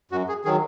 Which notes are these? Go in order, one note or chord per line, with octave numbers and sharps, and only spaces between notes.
F#2 F#4
G#4
D#3 F#3 G#4